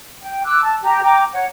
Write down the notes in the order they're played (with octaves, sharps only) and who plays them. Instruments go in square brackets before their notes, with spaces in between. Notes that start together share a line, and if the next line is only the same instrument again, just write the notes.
[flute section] G5
D6 E6 F#6
A5
G4 A#5
G5 A#5 D6
C#5 F#5